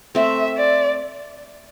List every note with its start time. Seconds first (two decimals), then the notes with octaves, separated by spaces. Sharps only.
0.15 A3 C4 E5
0.57 D5